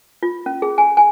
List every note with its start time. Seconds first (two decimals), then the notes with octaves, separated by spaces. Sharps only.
0.23 F4
0.46 C#4
0.62 G#4
0.78 G#5
0.97 G#5